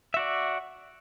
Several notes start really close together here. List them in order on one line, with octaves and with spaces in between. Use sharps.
E5 F#4 D5